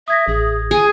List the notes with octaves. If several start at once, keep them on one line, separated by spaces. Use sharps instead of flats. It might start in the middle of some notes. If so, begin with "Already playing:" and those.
E5 D#6 G#6 A#6
A1 G#4
G#4 G#5